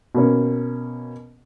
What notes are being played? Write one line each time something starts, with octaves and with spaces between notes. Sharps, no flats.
B2 A#3 C#4